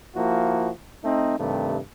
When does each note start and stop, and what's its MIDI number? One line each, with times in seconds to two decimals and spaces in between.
0.14 0.68 53
0.14 0.68 58
0.14 0.68 64
0.14 0.68 66
1.03 1.34 57
1.03 1.34 60
1.03 1.34 63
1.37 1.77 43
1.37 1.77 48
1.37 1.77 51
1.37 1.77 57